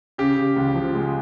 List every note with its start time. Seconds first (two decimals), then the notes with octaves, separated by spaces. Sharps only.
0.18 C#3 G4
0.37 C#3
0.56 C#2
0.75 F3
0.95 G#3